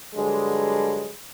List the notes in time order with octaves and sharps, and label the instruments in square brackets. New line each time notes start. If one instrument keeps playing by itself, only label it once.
[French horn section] G2 D3 F#3 G#3